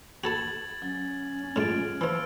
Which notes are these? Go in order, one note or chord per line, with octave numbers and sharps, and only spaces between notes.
F#4 A4 A5 B5 G#6 A6 F#7
F#3 C#4
A2 F#3 G#3 F4 F6 A6 D7
E3 F3 E6